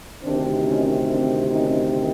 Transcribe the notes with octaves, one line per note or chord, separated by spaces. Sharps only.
D2 C3 D#3 C4 D4
C#4 D#4
C4 D4
C#4 D#4